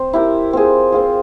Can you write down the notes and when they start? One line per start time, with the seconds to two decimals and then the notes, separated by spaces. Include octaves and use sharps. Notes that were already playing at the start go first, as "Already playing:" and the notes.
Already playing: C4 C5
0.13 E4 G4 A#4
0.53 C4 F4 G#4
0.92 C4 F4 G#4